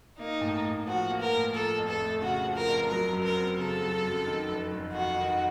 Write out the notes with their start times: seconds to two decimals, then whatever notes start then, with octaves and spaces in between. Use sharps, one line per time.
0.19 A#3 D#4
0.41 A2
0.65 A2
0.87 F3 F#4
1.10 A#3
1.21 A#4
1.32 A2
1.54 F3 A4
1.78 F2
1.89 A4
2.00 A3
2.22 C#3 F#4
2.45 F3
2.56 A#4
2.67 F2
2.90 F#3 A#4
3.13 F#2
3.24 A#4
3.36 C4
3.58 C#3 A4
3.81 F#3
4.04 F#2
4.27 D#3
4.49 F1
4.72 F1
4.93 F2 F#4
5.17 D#3